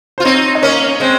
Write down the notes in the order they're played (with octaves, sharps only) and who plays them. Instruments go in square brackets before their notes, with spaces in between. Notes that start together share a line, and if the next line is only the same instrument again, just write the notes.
[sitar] F4 [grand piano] C5
[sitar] C4 D#4 [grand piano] C#5
[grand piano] D#5
[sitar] A#3 C#4 [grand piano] C#5
[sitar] G#3 C4 [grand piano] C5